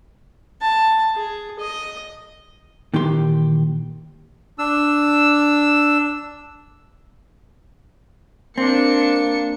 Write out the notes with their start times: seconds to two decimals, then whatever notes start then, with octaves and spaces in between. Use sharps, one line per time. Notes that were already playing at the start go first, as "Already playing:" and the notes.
0.62 A5
1.15 G#4
1.59 D#5
2.94 A#2 D#3 E3 G4 C6
4.59 D4 E6
8.58 A#3 C4 D4 C#7